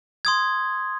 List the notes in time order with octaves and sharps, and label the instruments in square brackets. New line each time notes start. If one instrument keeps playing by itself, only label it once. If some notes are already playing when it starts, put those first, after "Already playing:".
[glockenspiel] C6 D#6 G#6